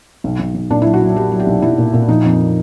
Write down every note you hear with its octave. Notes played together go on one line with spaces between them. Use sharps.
B1
B1
B1
A#2 D4
F#3 E4
F#4
F#3
F#3 G4
F#3
G4
B1
B1 E4
A#2
A#2
F3 D#4
F2